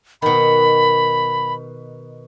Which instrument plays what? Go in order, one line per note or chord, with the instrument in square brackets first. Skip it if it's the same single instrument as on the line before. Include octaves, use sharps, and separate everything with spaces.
[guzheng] B2 D#3 [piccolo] B5